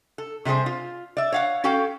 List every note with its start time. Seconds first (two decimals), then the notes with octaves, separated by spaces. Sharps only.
0.18 A4
0.45 C3 G3 E4 G#4 C5
0.66 F4
1.17 D5 E5
1.32 C#5 F5 F#5
1.64 C#4 F#4 A4 F5 G5